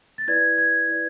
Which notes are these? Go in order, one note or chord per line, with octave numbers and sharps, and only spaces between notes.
A6
E4 B4 D5 G#6
G#6
E4 B4 D5